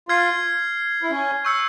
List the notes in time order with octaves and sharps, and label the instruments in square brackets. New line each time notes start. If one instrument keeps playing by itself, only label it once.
[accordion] F4 [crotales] F6 G#6 C7
[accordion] E4
C#4
[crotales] C#6 E6 G6 C#7